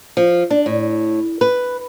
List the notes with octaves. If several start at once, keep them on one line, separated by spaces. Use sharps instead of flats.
F3
D4
A2
B4